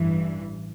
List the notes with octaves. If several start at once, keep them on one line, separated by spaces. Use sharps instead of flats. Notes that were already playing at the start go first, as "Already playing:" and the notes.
Already playing: A1 G2 E3